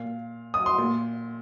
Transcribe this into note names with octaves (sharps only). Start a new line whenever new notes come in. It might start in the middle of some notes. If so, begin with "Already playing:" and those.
Already playing: A#2 F5
D#6
C6
A#2